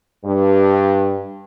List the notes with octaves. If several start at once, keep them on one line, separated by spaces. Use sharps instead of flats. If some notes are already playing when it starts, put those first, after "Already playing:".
G2